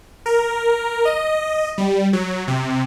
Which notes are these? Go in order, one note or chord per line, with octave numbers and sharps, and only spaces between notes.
A#4
D#5
G3
F#3
C3